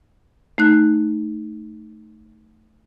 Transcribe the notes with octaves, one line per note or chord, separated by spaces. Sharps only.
A3 D#4 F#6